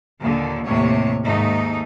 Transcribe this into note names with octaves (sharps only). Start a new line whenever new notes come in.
D#2 A#2 D3
D#2 A2 C3 A3 C#5
D#2 G#2 A3 D#4